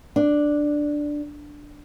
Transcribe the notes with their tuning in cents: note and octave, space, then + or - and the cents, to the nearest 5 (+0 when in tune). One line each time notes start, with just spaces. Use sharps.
D4 +5